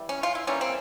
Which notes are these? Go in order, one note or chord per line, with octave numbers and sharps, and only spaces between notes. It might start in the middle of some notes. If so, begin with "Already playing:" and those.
Already playing: E3 G3
C#4
F4
E4
E3 G3 A#3 C#4
C4